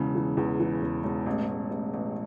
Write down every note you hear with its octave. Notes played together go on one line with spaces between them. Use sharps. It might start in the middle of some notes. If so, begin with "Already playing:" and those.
Already playing: E1 C#3 E3
E3
E2
E3
E1
E1
A1
A1
A1
A1